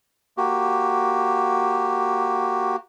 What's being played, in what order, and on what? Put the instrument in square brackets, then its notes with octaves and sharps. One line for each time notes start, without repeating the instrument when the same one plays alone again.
[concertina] A#3 F#4 G4